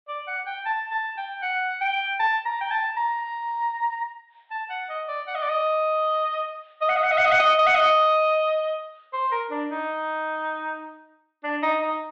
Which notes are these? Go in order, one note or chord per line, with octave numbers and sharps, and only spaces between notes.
D5
F#5
G5
A5
A5
G5
F#5
G5
A5
A#5
G5
A5
A#5
A5
F#5
D#5
D5
F#5
D#5
D5
D#5
D#5
F#5
D#5
F#5
D#5
F#5
D#5
F#5
D#5
D#5
F#5
D#5
C5
A#4
D4
D#4
D4
D#4
D#4